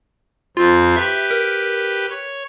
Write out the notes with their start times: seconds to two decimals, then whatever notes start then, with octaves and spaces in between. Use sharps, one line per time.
0.57 F2 C4 F4
0.96 G4 B4 E5
1.31 A#4
2.10 C#5